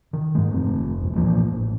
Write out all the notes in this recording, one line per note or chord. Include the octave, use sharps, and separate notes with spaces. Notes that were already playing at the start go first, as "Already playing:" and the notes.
D#3
G#2 G#3
F1 A3 C4
B1 E2
A#2 E3 F3 A#3
A1